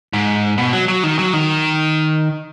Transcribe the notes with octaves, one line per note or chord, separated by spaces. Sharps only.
G#2
B2
F#3
F#3
D#3
F#3
D#3